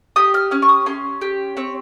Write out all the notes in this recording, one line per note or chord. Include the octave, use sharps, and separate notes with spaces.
G4 D#6
F6
C#4 F6
C#6
D#6
C#4 C6
G4
C4 C#5